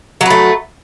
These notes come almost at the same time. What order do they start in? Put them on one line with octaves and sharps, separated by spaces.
F#3 B4 A3